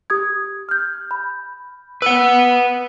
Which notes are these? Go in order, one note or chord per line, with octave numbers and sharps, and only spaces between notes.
G4 D#6 G#6
F6 G6
B5
B4 F#5 E6